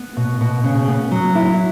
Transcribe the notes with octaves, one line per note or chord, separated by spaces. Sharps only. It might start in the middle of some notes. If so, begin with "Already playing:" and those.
Already playing: B3
B2
B2
C#3
B3
F#3
E4